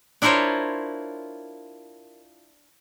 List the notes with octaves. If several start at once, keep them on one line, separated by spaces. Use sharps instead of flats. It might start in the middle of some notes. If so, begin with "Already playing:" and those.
D4 E4 F4 A#4 C5 C#5